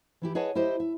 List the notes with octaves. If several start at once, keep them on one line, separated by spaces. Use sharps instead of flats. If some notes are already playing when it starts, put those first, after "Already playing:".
E3 E4 G4
G#4 B4 C#5 D#5 F#5 A5
E4 G4 C5 D#5
E5